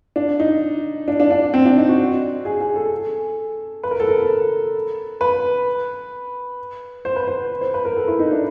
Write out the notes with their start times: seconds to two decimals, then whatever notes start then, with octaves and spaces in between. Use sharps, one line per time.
0.16 D4
0.40 D#4
1.08 D4
1.20 D4
1.31 D4
1.54 C4
1.65 D4
1.77 D#4
1.89 F#4
2.45 G#4
2.60 G#4
2.76 A4
3.83 B4
3.91 A#4
4.00 A4
4.07 A#4
5.21 B4
7.05 C5
7.16 B4
7.28 C5
7.61 C5
7.74 B4
7.85 A#4
7.96 A4
8.08 E4
8.19 D#4
8.31 D4